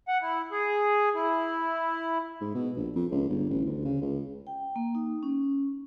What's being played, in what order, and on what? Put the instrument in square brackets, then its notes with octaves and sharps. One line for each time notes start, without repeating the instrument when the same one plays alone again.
[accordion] F#5
E4
G#4
E4
[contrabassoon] G#2
B2
A#1
F2
C#2
G1
A1
D2
C#3
C#2
[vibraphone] G5
A#3
D#4
C#4